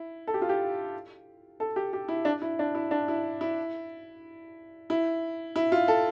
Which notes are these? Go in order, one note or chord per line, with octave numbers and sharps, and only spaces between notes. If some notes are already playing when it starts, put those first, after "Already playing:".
Already playing: E4
A4
G4
F4
G4
A4
G4
G4
E4
D4
E4
D4
E4
D4
E4
E4
E4
E4
F4
A4